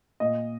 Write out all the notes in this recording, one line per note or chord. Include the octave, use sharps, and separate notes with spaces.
A#2 D#5